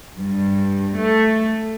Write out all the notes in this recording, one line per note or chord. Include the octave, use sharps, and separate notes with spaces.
G2
A3